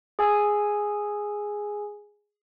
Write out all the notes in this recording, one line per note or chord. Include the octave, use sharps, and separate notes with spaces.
G#4 G#5 E6